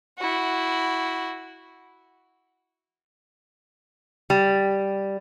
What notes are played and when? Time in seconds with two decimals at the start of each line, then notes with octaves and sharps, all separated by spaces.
0.18 E4 F#4
4.30 G3